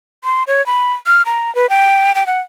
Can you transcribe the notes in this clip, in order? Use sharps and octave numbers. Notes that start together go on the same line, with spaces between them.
C6
C#5
B5
F6
A#5
B4
G5
G5
F#5